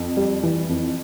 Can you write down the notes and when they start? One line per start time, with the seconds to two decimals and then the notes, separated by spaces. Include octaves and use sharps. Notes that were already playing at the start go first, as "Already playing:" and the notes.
Already playing: F2
0.17 G3
0.43 E3
0.69 F2